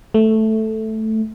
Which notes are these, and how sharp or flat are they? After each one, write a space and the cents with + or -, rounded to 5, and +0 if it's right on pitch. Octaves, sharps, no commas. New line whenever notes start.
A3 +0